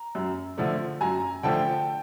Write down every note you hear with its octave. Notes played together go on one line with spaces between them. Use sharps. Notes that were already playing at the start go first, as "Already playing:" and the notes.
Already playing: A#5
F#2
D3 F3 A3
F#2 G#5 A#5
D3 F3 A3 G5 A5